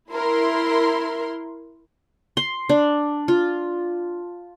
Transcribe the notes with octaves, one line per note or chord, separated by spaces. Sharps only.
E4 A#4 C6
C6
D4
F4